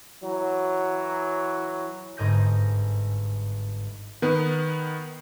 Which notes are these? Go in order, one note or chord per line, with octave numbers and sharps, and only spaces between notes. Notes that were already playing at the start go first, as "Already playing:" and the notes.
E3 F#3
G1 G#2 G#4 D#5 G6 A#6
D#3 B3 B4